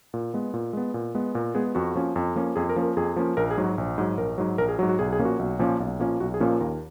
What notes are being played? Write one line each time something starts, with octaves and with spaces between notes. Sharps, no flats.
A#2
G#3 B3
A#2
G#3 B3
A#2
G#3 B3
A#2 A#4
G#3 B3 G#4
F2 F#4
F3 A#3 C#4
F2
F3 A#3 C#4
F2 G#4
A#4
F3 A#3 C#4
A#4
F2 G#4
F3 A#3 C#4
A#1 A#4
G#4
G#2 F#3
F#4
A#1
G#2 F#3
A#1 A#4
G#2 F#3
A#1 A#4
G#4
G#2 F#3 F#4
F#4
B1 G#4
G#4
A#2 F3 A#3 C#4
F#4
B1
A#2 F3 A#3 C#4
B1
A#2 F3 A#3 C#4
B1 F#4
G#4
A#2 F3 A#3 C#4
A#4
D#2 A#4